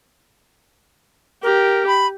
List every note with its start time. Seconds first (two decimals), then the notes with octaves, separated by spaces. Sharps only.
1.43 G4 A#4
1.87 B5